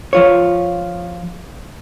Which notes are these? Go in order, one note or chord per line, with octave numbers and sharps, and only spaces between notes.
F3 F4 C#5